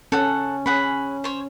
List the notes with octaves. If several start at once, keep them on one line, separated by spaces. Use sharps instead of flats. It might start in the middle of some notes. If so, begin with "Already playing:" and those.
C#4 A4 F#5
C#4 G#4 F#5 B5
C5 C#5